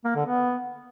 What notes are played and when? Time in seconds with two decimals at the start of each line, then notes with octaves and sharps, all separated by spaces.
0.05 A#3
0.15 D3
0.26 B3